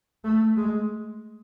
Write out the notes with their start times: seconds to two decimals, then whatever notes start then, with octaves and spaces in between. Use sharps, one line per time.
0.24 A3
0.57 G#3